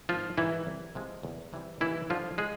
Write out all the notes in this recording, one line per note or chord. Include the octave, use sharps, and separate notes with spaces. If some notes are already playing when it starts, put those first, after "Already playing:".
G#1 F3 F4
G#2 D#3 E3 G3 E4
C2
C3 F3 G#3
E2
C3 E3 G3
D#2 E3 E4
D3 F3 G3 F4
G#3 G#4